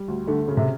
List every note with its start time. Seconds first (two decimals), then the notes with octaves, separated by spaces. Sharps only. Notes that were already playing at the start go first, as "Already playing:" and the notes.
Already playing: G3
0.08 D2
0.27 D3 A3
0.48 C#3
0.57 C3